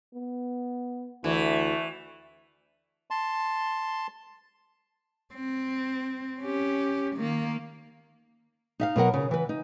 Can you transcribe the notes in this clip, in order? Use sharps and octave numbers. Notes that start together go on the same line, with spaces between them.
B3
D2 E3 A3 E4
A5 C6
C4
C#4 G4
D#3 A#3
D#4 E5 F5
B2 F#3 A#4 F#5
C#3
E3 B4
D#4